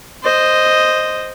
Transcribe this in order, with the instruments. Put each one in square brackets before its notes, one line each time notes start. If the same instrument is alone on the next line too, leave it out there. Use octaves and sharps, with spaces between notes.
[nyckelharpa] C5 D#5